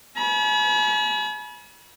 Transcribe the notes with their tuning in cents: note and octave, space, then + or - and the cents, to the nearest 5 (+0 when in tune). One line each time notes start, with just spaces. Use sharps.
G#5 +45 B5 -35